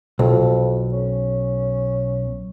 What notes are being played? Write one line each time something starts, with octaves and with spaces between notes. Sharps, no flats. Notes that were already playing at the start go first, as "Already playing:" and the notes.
B1 F2
C#4